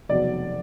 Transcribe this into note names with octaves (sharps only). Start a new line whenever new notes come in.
F1 E2 B2 F#3 B3 D5